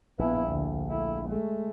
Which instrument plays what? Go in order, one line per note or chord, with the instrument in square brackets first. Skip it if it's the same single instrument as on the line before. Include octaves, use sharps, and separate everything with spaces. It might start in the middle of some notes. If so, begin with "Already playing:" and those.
[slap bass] A#1 [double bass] B3 E4
[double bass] D2
A3 E4
G#3 A3